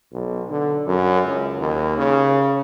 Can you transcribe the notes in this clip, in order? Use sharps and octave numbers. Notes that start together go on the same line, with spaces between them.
B1
D3
F#2
C#2
D#2
C#3